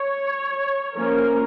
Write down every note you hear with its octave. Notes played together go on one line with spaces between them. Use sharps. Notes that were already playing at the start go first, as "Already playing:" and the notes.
Already playing: C#5
F3 A#3 C#4 A#4